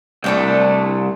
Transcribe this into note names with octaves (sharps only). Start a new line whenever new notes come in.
C2 A3 D4 G5